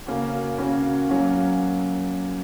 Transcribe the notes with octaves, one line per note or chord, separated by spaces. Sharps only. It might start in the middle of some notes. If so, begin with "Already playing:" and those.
C#3 A#3 C#4 F#4
C#3 A#3 C#4 F#4
F#3 A#3 C#4 F#4